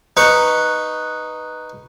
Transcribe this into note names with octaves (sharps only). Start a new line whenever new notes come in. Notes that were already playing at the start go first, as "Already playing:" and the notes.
D#4 B4 C#6